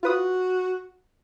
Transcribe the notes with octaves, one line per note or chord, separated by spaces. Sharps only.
F4 F#4 B4 D#6